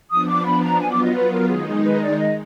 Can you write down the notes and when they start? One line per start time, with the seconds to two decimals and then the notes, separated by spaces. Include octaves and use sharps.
0.10 F3 B3 D4 D#6
0.27 D6
0.45 B5
0.63 A#5
0.80 F#3 B3 F4 G#5
0.92 D6
1.03 D#5
1.15 B4
1.32 A#4
1.49 D#3 G#3 D#4 G#4
1.68 G#4
1.84 B4
2.01 D5
2.19 D#5